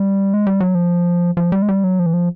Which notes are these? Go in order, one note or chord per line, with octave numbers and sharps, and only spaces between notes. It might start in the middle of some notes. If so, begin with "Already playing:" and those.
Already playing: G3
G#3
G3
F#3
F3
F3
G3
G#3
G3
F#3
F3
E3
F3